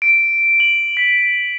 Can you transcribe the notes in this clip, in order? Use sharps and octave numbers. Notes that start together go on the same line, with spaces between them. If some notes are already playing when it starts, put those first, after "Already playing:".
D7
F#7
B6